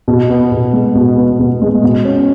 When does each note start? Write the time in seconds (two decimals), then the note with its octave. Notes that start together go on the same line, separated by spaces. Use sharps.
0.08 B2
0.30 B3
0.52 B2
0.73 G#3
0.95 B2
1.17 B3
1.39 B2
1.62 G#3
1.83 B2
2.05 C#4